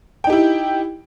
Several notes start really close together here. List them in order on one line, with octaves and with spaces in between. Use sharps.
G5 D#4 G4 E4